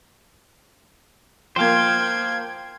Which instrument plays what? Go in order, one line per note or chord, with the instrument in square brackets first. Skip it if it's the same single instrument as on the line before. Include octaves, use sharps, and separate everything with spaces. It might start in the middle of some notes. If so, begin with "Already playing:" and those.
[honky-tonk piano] F3 A#3 [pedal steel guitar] C5 F5 [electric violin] G5 G#6